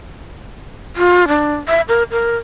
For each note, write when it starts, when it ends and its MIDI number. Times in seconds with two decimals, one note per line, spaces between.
0.96 1.28 65
1.28 1.56 62
1.68 1.81 76
1.89 2.03 70
2.11 2.36 70